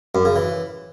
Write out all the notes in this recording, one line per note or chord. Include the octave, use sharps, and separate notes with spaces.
F#2
C#3
E3